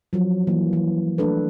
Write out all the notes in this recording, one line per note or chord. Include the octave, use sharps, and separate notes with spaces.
F3 F#3
E3 A#3
E3
A3 D4 A4 B4